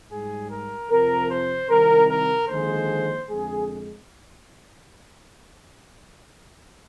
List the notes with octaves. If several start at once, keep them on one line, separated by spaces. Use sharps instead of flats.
G#2 G3 G#4
A#4
F2 C3 F3 A#4
C5
C2 C3 D#3 A#4
A#4
D#2 D3 F3 G#3 C5
F2 D3 G#3 G#4